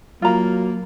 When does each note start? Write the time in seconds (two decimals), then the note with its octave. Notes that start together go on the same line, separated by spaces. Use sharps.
0.22 F#3 A#3 F4 A#5